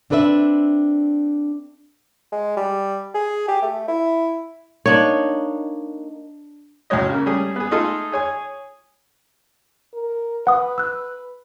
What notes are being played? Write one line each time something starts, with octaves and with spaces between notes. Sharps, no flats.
C4 D4 A4 B4 D#5 E5
G#3
G3
G#4
G4
A3
E4
A#3 D4 D#4 C#5
C#2 A2 F#3 C#5 D#5
C#3 A#3
G3 A3 C#4 G#4
B3 G#4
A3 D#4 F4 G#4 A4
G#4 C#5 G#5
A#4
B4 F#5 D#6
E6 F#6